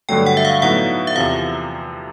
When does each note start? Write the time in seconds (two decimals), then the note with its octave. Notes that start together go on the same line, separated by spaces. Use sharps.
0.09 G2 D3 F#3 A3 G5
0.26 F#5
0.37 E5
0.45 F5
0.62 A2 F#3 B3 D#4 F#5
1.07 E5
1.16 E2 C3 F3 F5